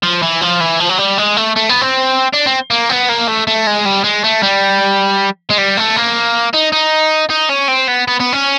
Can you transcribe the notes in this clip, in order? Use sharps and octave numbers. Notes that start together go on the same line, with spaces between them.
F3
E3
F3
E3
F3
F#3
G3
G#3
A3
A3
B3
C4
D4
C4
A#3
B3
A#3
A3
A3
G#3
G3
G#3
A3
G3
G#3
G3
A3
A#3
D#4
D#4
D#4
C#4
C4
B3
B3
B3
C#4